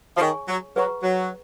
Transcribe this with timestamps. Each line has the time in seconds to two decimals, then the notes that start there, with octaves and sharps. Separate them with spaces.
0.17 F3
0.21 D#3 G#4 C#5 G#5 C#6
0.48 F#3
0.76 F#3 G#4 B4 F#5 A#5 C#6
1.03 F#3